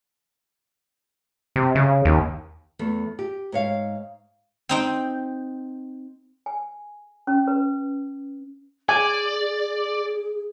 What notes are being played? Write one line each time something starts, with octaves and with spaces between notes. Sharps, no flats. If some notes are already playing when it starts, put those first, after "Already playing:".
C3
C#3
D#2
E2 A3
G4
G#2 C#5 F5
C4 D#4 G5
G#5
C#4
B4
G#4 D5 G#5